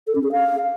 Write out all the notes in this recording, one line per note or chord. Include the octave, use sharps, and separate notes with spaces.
A4
C#4
G#4
F5